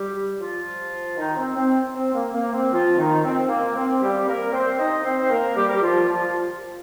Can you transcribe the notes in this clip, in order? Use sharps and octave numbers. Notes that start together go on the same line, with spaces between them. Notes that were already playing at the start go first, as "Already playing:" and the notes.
Already playing: G3 G4
F3 F4
D#3 D#4
C4
C4
C4
A#3
A#3
C4
F3 F4
D#3 D#4
C4
A#3
C4
G3 G4
A#3 A#4
C4 C5
D#4 D#5
C4 C5
C5
A#3 A#4
G3 G4
A#4
G4
F3 F4
F3 F4